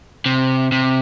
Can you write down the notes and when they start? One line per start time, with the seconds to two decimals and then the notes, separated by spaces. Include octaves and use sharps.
0.26 C3
0.72 C3